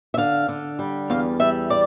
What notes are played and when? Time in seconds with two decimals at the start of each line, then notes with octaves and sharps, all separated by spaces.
0.14 E5
0.17 D3 F5
0.49 D3
0.79 G3
1.10 E2 F5
1.40 G3 E5
1.70 D5